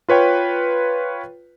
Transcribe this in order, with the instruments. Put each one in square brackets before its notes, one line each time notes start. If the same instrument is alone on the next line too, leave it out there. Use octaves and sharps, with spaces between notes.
[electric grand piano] F4 B4 C#5 G5